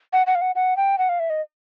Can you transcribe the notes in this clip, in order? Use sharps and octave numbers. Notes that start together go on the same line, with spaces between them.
F#5
F#5
F5
F#5
F#5
G5
F#5
F5
E5
D#5